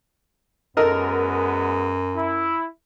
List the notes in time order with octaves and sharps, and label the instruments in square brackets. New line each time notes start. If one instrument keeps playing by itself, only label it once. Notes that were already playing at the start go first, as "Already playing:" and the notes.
[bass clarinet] F#2 [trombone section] F#3 G#3 B3 [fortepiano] A4 A#4 D#5
[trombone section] E4